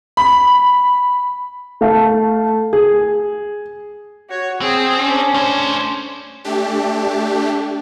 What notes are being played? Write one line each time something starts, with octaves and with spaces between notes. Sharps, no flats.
B5
A3 F5 A5
G#4
F#4 C#5
C4 G#4 G5
C#4 D4
A3 C5
A3 D4 G4